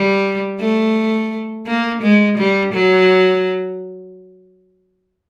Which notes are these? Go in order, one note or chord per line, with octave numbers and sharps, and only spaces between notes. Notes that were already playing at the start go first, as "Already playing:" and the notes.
Already playing: G3
A3
A#3
G#3
G3
F#3